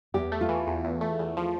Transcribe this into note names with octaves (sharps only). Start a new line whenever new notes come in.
E2 G4
A3
F4
E3
E2
E2
A3
E2
F3